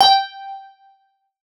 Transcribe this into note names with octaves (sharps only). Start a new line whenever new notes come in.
G5